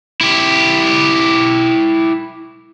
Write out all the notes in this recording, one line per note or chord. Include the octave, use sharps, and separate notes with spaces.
E4 G4